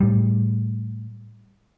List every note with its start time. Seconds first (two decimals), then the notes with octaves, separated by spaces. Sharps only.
0.01 A2 G3